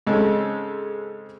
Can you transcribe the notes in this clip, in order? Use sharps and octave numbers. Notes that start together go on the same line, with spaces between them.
G#2 C#3 G#3 C4 A4